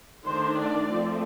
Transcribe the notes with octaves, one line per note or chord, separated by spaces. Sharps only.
D#3 A3 D4 C5
D5
F3 A3 C4